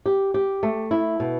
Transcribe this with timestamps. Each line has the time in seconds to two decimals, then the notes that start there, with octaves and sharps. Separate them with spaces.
0.06 G4
0.34 G4
0.63 A3
0.91 E4
1.20 B2